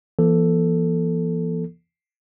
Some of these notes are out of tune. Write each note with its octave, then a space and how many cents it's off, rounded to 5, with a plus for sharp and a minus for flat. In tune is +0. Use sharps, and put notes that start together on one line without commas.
E3 +40 A#3 +45 A4 +0